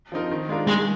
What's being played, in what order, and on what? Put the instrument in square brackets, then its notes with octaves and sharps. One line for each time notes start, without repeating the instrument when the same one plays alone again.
[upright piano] F3 C4 D#4 A#4
D#3
G#3 D4 F4 A#4
[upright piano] D#3 [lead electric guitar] G#3